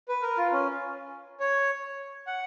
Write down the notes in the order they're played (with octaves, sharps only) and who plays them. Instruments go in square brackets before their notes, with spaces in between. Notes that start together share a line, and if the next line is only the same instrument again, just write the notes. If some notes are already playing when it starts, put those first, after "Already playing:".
[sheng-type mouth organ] B4
A#4
F4
C#4
C#5
F#5